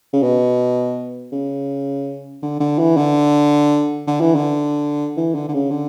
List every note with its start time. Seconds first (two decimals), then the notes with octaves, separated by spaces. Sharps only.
0.13 C#3
0.23 B2
1.32 C#3
2.42 D3
2.60 D3
2.78 E3
2.97 D3
4.07 D3
4.20 E3
4.35 D3
5.17 E3
5.35 D3
5.48 D3
5.54 C#3
5.71 D3